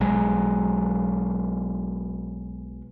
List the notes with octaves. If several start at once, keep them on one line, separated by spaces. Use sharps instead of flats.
B1 F#3 G#3